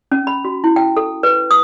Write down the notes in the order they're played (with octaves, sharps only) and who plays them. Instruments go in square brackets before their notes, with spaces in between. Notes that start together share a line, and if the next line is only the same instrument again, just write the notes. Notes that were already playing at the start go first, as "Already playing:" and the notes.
[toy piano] C#4
B5
F#4
E4
G5
A4
B4
D#6